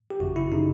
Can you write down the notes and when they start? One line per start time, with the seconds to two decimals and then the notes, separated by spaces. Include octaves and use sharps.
0.10 G4
0.20 G#1 F#2 C#3 F#4
0.36 E4
0.52 C#3 D#4